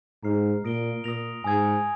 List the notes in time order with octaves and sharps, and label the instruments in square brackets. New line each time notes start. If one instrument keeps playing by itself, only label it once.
[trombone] G#2 [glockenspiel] A#5 F6 C7
[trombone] A#2 [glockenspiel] D#6 A#6 D7 G7
[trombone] A#2 [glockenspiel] D#6 A#6 F7
[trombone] G#2 [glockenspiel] G#5 D#6 G#6